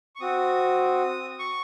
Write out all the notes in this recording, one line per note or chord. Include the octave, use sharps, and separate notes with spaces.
C#6
C4 F#4 D#6
C#6